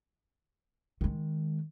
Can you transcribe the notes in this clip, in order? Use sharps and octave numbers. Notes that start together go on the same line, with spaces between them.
D#3 G#3